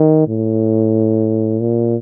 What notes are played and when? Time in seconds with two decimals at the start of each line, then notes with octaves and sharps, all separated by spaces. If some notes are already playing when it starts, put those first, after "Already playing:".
Already playing: D#3
0.28 A2
1.61 A#2